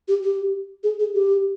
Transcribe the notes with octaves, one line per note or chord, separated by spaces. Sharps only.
G4
G4
G#4
G#4
G4